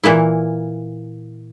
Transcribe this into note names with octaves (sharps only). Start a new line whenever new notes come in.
A#2 E3 A#3 E4